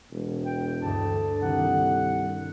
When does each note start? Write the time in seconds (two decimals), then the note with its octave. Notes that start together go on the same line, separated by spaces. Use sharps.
0.12 E1
0.45 G5
0.82 D2 G2 A5
1.42 C2 D3 D#3 G3 F#5